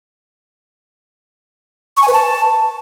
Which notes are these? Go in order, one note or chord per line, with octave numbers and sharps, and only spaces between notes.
C#6
G#5
B4
A5